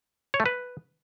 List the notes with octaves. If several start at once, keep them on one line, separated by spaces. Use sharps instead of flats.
C#5
A3
B4